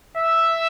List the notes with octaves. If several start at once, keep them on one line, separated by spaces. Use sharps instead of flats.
E5